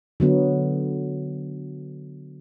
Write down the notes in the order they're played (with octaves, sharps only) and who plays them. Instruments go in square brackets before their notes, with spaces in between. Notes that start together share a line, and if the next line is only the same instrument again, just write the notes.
[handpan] D3 F#3 B3